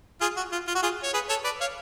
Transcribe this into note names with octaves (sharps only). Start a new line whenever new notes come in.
F4 G#4
F#4
F4
F4
F#4
F4 G#4
C#5
G#4 B4
A4 C#5
B4 D5
C#5 F5